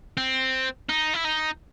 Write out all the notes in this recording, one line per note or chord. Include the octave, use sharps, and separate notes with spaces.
C4
D#4
E4
D#4